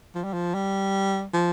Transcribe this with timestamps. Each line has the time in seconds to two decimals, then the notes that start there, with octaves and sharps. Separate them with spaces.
0.15 F3
0.24 G3
0.33 F3
0.54 G3
1.33 F3